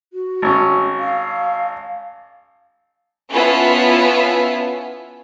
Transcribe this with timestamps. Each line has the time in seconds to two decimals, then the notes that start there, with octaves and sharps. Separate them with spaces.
0.12 F#4
0.42 G#1 C#4
0.99 F5
3.32 B3 C#4 E4 F4 E5 A5